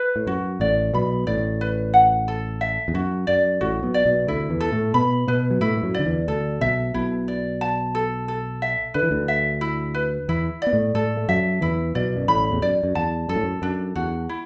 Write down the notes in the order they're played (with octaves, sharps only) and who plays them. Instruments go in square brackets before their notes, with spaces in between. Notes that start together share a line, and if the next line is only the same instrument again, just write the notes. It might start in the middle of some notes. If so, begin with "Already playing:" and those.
Already playing: [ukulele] B4
[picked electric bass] A2
[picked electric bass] F#2 [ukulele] F#4
[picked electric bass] A1 A2 [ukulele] D5
[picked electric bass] B1 B2 [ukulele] B5
[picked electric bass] A1 A2 [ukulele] D5
[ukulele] B4
F#5
A4
E5
[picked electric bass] E2
[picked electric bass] F#2 [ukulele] F#4
[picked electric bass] F#2 [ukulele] D5
[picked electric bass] A1 A2 [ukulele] F#4
[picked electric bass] B1 B2
[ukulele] D5
[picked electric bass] B1 B2
[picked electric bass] D2 D3 [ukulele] E4
[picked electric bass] E2 E3
[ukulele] A4
[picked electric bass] A2 A3
[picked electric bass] B2 B3 [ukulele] B5
[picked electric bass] B2 B3 [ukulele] B4
[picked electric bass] F#3
[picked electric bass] A2 A3 [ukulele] E4
[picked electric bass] A3
F#2 F#3
[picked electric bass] D3 [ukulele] D5
[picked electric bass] E2 E3
[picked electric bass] D2 D3 [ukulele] A4
[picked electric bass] B1 B2 [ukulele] E5
[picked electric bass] B1 B2 [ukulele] E4
[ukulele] D5
A5
A4
A4
E5
[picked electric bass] D3 [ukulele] B4
[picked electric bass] E3
D2 D3
[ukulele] E5
E4
B4
[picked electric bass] E2 E3 [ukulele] E4
[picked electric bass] B3 [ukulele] D5
[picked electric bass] A2 A3
[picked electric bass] A2 A3 [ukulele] A4
[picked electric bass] A3
[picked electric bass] F#2 F#3 [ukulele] E5
[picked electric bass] E2 E3 [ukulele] E4
[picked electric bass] B1 B2 [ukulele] D5
[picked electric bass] F#2
[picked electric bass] A1 A2 [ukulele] B5
[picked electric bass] E2
[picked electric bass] F#2 [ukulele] D5
[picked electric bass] F#2
[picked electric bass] E2 [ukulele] A5
[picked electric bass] F#2 [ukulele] A4
[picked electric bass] A2
F#2
[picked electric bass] F#2 [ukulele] D4
[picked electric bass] E2 [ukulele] F#4
[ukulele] E4